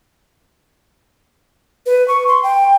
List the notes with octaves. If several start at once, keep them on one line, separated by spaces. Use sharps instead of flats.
B4
C#6
C6
G5